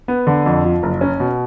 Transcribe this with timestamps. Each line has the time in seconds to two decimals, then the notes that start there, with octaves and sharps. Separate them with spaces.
0.08 B3
0.27 D3
0.46 F2
0.64 F3
0.83 F#1
1.01 C#4
1.20 B2